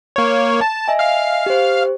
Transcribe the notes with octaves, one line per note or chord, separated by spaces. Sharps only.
A#3 C#5
A5
D#5 E5 G#5
F5 F6
G4 C5